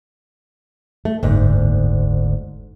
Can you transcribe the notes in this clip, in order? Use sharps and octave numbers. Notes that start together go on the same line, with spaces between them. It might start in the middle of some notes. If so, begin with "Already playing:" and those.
A3
F#1 D2 G#2 A#3